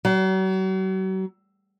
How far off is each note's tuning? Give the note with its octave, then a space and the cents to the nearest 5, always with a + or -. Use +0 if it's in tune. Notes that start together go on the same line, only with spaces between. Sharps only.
F#3 +40